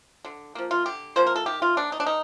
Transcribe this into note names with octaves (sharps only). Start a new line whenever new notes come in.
D3
F3 A#3
F4
D3 G4
F3 A#3 C5
A#4
A4
D#3 G4
F4
G3 A#3 D4
D#4
D4
D#3 D#4